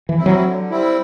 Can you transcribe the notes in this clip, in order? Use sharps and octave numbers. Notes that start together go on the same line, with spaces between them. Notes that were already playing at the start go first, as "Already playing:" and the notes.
E3
G3 C4 E4
F#3
D3
G3 C4 E4